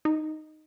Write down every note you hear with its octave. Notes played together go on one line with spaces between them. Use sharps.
D#4